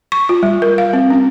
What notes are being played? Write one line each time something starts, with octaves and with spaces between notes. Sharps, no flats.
C#6
F4
G3
A#4
F5
C4
C#4